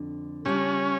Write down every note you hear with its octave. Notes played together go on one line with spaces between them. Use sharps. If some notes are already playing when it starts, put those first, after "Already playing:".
Already playing: F2 D3
C#3 G3 C#4 D4 F4